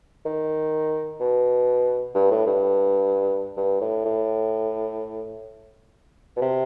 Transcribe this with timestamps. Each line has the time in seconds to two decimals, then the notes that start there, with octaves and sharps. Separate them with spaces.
0.25 D#3
1.20 B2
2.14 G2
2.31 A2
2.46 G2
3.57 G2
3.81 A2
4.05 A2
6.36 B2
6.42 C3